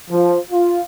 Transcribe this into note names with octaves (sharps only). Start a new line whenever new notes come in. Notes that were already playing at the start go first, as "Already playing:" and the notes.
F3
F4